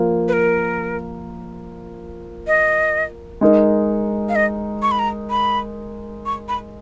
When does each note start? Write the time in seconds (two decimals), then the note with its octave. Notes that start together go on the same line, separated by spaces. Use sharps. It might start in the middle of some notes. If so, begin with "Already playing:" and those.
Already playing: F3 A#3 F4
0.28 B4
0.33 A#4
2.47 D#5
3.41 G#3 D#4 A#4
4.29 F5
4.36 D#5
4.82 C#6
4.91 B5
4.99 A#5
5.30 B5
6.26 C#6
6.48 B5